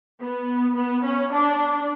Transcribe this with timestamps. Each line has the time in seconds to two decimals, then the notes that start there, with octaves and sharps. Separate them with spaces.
0.20 B3
0.76 B3
1.04 C#4
1.32 D4